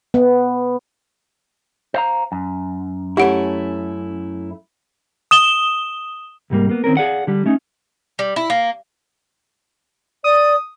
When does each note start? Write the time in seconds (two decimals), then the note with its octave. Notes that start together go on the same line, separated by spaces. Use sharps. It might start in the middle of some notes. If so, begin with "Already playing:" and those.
0.14 B3
1.94 C5 F5 A#5
2.32 F#2
3.17 A3 C#4 E4 G4 F#5 D7
5.31 D#6 E7 G7
6.50 C2 G#2 G3 A#3
6.69 A#3 B3
6.84 D#3 C4 C#4 A#4
6.97 G#4 D5 F5 F#5
7.27 D3 G3
7.46 A3 C#4 D#4
8.19 G3
8.36 E4
8.50 A#3
10.24 D5 D#6